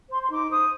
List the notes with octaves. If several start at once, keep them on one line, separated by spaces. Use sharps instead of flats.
C5 C6
C6
D#4 D6
C5 D#6